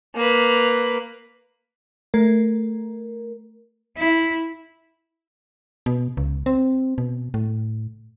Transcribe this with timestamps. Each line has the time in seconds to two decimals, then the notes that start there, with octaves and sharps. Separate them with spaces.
0.15 A#3 B4
2.14 A3 A#4
3.98 E4
5.86 B2
6.17 C#2
6.46 C4
6.98 B2
7.34 A2